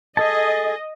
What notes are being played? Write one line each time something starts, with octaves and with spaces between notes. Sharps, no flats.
G#4 A4 D#5 A5